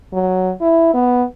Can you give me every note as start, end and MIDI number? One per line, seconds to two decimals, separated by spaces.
0.13 0.52 54
0.61 0.92 64
0.94 1.23 59